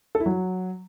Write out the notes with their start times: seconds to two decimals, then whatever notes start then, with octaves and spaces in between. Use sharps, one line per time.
0.15 A4
0.20 E4
0.26 F#3